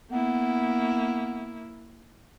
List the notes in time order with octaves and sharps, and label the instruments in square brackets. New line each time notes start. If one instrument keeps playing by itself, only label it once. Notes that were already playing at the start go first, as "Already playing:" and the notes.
[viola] A#3 E4 [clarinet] B3